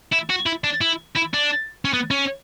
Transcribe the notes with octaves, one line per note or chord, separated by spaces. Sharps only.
E4
F#4
E4
D4
E4
E4
D4
C#4
B3
C#4